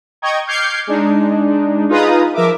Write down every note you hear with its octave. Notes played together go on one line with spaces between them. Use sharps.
D#5 G5 A#5 C#6 G#6
D6 F6 G6 G#6 C7 C#7
G#3 D4 D#4
D#4 F4 G#4 B4 A#5 D#6
F3 A#4 E5 D6